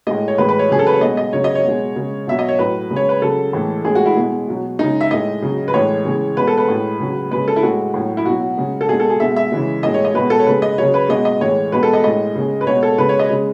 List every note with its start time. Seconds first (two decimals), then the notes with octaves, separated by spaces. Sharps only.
0.07 A2 G#3 D#5
0.28 C#5
0.38 A2 E3 G#3 B4
0.49 B4
0.59 C#5
0.70 C#3 F#3 G#4
0.79 A4
0.87 B4
0.94 C#5
1.01 B2 G#3 D#5
1.17 D#5
1.33 C#3 F#3 C#5
1.44 D#5
1.55 C#5
1.64 B2 G#3
1.96 C#3 G#3
2.27 B2 F#3 E5
2.39 D#5
2.48 C#5
2.59 A2 F#3 B4
2.91 C#3 G#3
2.96 C#5
3.09 B4
3.22 C#3 F#3 A4
3.53 A2 E3 G#3
3.85 A2 G#3 G#4
3.95 F#4
4.06 E4
4.17 B2 G#3
4.48 B2 F#3
4.79 C#3 G#3 D#4
5.01 E5
5.11 A2 G#3 D#5
5.42 C#3 F#3
5.68 B4
5.74 A2 E3 G#3 C#5
6.05 C#3 E3 G#3
6.36 B2 G#3 B4
6.48 A4
6.58 B4
6.68 A2 G#3
7.00 C#3 F#3
7.31 C#3 G#3 B4
7.48 A4
7.56 E4
7.63 A2 G#3 F#4
7.94 A2 F#3
8.17 E4
8.26 B2 F#3 F#4
8.58 C#3 G#3
8.81 A4
8.89 B2 G#3 G#4
9.00 A4
9.10 G#4
9.20 B2 G#3 E5
9.36 E5
9.52 C#3 E3 G#3
9.83 A2 G#3 D#5
9.94 C#5
10.05 D#5
10.14 B2 G#3 B4
10.30 A4
10.39 C#5
10.47 C#3 G#3 B4
10.62 D#5
10.78 C#3 F#3 C#5
10.94 B4
11.09 B2 G#3 D#5
11.25 D#5
11.41 A2 E3 G#3 C#5
11.72 B2 G#3 B4
11.83 A4
11.93 D#5
12.04 A2 G#3 D#5
12.35 C#3 G#3
12.61 B4
12.67 B2 G#3 C#5
12.83 A4
12.98 C#3 G#3 B4
13.09 C#5
13.19 D#5
13.30 C#3 G#3